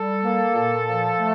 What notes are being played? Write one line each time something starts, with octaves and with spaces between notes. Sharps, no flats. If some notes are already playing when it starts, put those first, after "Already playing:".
Already playing: G3 A4
A#3
A#2
F3
A3